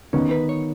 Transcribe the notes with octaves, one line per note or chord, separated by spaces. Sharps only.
D#3 B3 C#4 D#4
B4
C#5